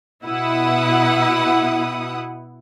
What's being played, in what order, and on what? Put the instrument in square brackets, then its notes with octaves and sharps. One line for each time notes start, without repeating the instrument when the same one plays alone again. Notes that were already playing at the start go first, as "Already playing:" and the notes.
[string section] B2 E4 F#5 D#6